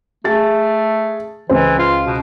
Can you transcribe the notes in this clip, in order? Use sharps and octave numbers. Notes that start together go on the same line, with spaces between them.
A3 G#4 A6
C#2 E3 C5
F4
B2